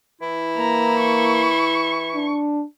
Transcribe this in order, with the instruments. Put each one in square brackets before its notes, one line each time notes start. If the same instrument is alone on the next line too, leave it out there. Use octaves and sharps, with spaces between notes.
[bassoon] E3 [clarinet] E4
[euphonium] A#3 [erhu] A#5
[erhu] C#6
[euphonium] D4